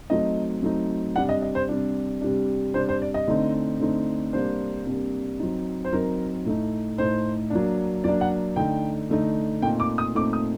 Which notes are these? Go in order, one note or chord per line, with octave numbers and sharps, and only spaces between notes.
F#3 A3 C4 D#4 D#5
F#3 A3 C4 D#4
C3 G3 D4 F#5
D#5
D#5
C5
C3 G3 D4
C3 G3 D4
C3 G3 D4 C5
C5
D5
D#5
D3 A3 C4 D#4
D3 A3 C4 D#4
C3 G3 A#3 D4 C5
C3 G3 A#3 D4
F#3 C4 D#4
C5
F#3 C4 D#4 A#4
A2 A3 D#4
A2 A3 D#4 C5
F#3 A#3 D4
F#3 A#3 D4 D5
F#5
D3 A3 D#4 G5
D3 A3 D#4
A#2 A3 C4 D#4 G5
D6
D#6
A#2 A3 C4 D#4 D6
D#6